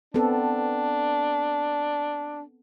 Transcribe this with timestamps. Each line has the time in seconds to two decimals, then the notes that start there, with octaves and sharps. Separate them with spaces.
0.14 B3 C4 D4 A4